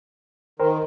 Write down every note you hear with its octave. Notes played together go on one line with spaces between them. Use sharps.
D#3 A#4 C5 G5